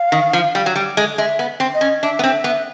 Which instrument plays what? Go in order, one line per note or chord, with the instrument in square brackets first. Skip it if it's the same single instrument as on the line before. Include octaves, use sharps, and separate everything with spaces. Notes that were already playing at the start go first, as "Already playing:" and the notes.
Already playing: [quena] F5
[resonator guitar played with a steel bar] D#3
F3
G3
F#3
G3
G#3
[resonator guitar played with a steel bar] G#3 [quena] E5
[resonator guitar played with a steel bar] B3
C4
[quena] D#5
[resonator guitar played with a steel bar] C#4
[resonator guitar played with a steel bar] D4 [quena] E5
[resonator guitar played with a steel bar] B3
C4
B3